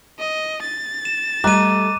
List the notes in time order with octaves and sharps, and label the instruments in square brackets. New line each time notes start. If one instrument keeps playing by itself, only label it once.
[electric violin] D#5
A6
[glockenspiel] E7
[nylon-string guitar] G3 A3 [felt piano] D#5 A#5 F#6 [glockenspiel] D6 D#7